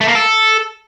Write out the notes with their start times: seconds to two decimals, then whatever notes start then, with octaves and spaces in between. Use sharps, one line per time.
0.01 A3
0.08 A#3
0.15 A4